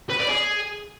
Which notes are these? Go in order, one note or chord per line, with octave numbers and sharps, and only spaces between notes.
B4
D5
G#4